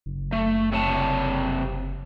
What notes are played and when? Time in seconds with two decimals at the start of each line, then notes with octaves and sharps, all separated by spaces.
0.06 F#1
0.32 A3
0.72 C3 C#5 A5